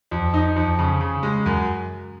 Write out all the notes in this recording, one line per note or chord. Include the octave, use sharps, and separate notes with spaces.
F2
D#4
F2
C#3
C#3
G#3
F#2